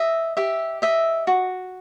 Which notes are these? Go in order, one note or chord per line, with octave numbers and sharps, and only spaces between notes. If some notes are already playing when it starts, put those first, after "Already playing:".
Already playing: D#5 E5
G4 E5
D#5 E5
F#4